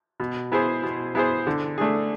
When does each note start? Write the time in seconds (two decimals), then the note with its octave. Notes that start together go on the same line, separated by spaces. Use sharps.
0.20 B2
0.52 B3 E4 G#4 C5
0.83 B2
1.15 B3 E4 G#4 C5
1.47 D3
1.78 A3 D4 G#4